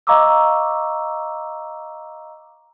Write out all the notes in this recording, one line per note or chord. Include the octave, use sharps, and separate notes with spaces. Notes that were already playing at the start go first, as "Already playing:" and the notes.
D#5 F5 A#5 C#6 D6 E6